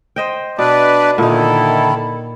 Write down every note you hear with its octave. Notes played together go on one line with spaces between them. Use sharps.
C5 D#5 G5
B2 D4 B4 D5
A#2 D3 D#3 D#4 E4 A4